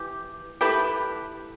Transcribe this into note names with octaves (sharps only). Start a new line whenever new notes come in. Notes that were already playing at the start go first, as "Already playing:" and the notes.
Already playing: E3 G4
A3 E4 G4 B4